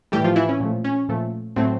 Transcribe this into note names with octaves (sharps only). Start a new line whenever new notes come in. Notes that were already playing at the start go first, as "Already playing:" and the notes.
A2 E3 G3 A3 G4
F3 F4
E3 E4
C#4
A#2 F3 A3
C#4
A#2 F3 A3
A2 F#3 A3 C4